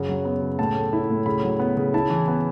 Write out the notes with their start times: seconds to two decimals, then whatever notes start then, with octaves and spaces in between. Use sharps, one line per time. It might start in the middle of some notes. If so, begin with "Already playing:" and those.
Already playing: F#2 C#3 F#5
0.09 F#3
0.25 B3
0.42 C#3
0.59 A2 A5
0.76 A3
0.93 E4
1.10 A2
1.26 C#3 B5
1.44 F#3
1.59 B3
1.77 C#3
1.94 E4 A5
2.10 E3
2.28 B3